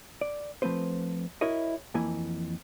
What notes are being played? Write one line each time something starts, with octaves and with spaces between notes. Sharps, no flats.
D5
F3 A3 C4 B4 C5
E4 F#4 A#4 C#5 D#5
F2 E3 A#3 E4 G#5